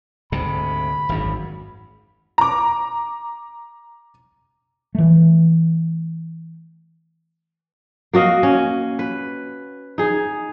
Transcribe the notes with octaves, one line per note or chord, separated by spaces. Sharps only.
D2 G#2 C3 B5
G#1 F#2
A#5 D6
E3 A3
A#3 F#4 D#5 F5
C#4
B4
D#4 G#4